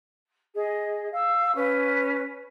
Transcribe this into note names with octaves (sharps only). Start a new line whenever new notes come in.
G#4 D#5
F5 E6
C#4 B4